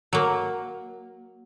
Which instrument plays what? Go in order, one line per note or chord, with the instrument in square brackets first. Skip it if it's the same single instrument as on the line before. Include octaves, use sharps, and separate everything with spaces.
[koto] F#3 A#3